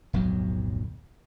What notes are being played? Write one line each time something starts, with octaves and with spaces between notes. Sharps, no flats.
D1 B1 F2 F#3